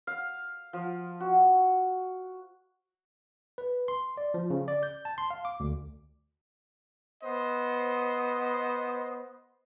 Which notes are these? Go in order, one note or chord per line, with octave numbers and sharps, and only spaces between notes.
F5
F3
F#4
B4
C6
D5
F3
C#3
D5
G6
A5
C6
F5
D6
D2
B3 C5 D#5